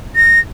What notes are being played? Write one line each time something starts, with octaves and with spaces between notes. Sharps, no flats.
A#6